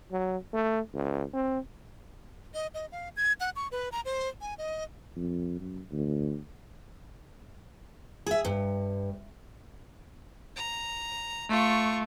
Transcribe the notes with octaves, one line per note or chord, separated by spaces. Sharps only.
F#3
A3
C#2
C4
D#5
D#5
F5
G#6
F#5
C#6
B4
A#5
C5
G#5
D#5
F2
F#2
D2
G#4 E5
G2
A#5
A3 F4 C#6